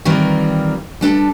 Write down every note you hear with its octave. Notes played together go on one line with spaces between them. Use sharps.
D#3 E3 G3 C4 F4 A#4
G3 D4 A4 A5